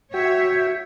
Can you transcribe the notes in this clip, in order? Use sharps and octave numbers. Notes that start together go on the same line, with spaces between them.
F#4 C#5 E5 G5